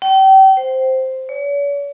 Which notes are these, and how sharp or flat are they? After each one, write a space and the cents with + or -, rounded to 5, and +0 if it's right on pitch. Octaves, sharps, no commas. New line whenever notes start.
G5 -35
C5 +0
C#5 +45